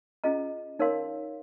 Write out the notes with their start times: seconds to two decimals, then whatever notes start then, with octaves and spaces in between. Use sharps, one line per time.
0.24 C#4 F4 G#4 D#5 A#5
0.79 D#4 A#4 C#5 F5 C6